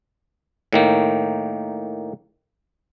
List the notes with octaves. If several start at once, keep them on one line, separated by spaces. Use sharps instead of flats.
A2 D#3 A#3